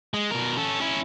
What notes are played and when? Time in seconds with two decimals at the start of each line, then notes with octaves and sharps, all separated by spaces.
0.14 G#3
0.31 B2 A#4
0.57 C#4 A4
0.80 C#4 E4